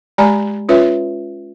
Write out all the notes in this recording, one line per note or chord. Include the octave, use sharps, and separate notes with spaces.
G#3 G4 D5 G#5 A#5 B5
C#4 F4 B4 C#5 E5